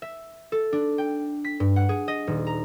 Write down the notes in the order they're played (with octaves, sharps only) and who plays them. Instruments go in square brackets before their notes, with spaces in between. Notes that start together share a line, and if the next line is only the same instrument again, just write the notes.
[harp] E5
A4
D4
G5
B6
G2
F#5
G#4
D#5
D#1
A#5